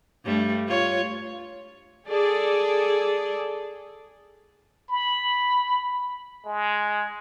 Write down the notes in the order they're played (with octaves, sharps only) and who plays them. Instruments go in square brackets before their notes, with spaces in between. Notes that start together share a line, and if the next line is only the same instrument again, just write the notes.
[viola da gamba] G2 G3 A3
F4 C#5
[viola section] G#4 A4 D5
[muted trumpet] B5
G#3